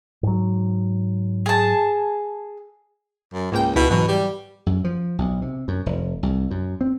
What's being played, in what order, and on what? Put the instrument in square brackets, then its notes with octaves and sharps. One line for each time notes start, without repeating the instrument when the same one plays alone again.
[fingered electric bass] G#2 F#3
[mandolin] G#4 A5
[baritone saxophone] F#2
[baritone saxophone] C#2 [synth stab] G#2 A#3 G5
[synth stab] C#2 E4 [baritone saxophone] B2
[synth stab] G#2 E3 F#3 [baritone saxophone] B2
[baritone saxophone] G3
[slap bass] F#2
F3
B1
C3
F#2
F1
C2
F#2
C4